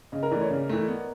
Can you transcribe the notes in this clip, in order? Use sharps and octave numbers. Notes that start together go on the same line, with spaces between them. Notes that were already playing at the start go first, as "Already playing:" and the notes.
C#3 D#5
A#4
E3 A3 D5
C#5
C#3
E3 A3
B3